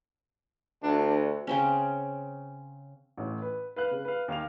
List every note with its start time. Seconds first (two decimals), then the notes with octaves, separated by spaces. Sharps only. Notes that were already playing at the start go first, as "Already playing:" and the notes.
0.83 D2 D4
1.47 C#3 C4 C#4
3.17 A1 A2
3.42 B4
3.76 B4 F5 F#6
3.91 C#3
4.05 B4 F5
4.28 D#2 F5 F7